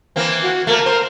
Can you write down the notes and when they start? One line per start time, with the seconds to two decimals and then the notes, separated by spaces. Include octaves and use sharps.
0.16 E3 A#3 C4
0.43 F#4
0.67 A3 A#3 A#4
0.86 C5